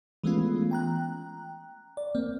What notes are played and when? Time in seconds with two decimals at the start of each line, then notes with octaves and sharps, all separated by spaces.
0.24 E3 G#3 A3 B3 C#4 F4
0.71 G5 A#5 F#6
1.97 D5
2.15 A#3 C4